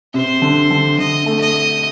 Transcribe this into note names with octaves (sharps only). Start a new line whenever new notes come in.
C3 C5
D3
D3
D3 D#5
A3
D#5